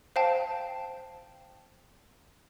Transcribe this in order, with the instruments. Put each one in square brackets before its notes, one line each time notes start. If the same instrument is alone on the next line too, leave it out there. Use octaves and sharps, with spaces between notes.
[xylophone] C5 F5 G5 A5